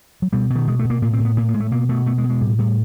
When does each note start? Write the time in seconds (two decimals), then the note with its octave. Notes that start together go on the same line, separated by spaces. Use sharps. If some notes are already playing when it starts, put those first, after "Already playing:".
0.22 F#3
0.33 B2 G3
0.50 B2
0.56 D#3
0.67 B2 G#3
0.79 A3
0.85 B2
0.90 A#3
1.02 A2 A#3
1.14 C4
1.20 A2
1.25 B3
1.37 A2 A#3
1.49 A#3
1.54 A2 G#3
1.60 A3
1.71 B2 A#3
1.89 B2 A3
2.06 B2 A3
2.18 G#3
2.24 B2
2.30 G#3
2.41 A2 G3
2.58 A2 G3